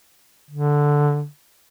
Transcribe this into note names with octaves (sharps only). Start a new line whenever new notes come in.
D3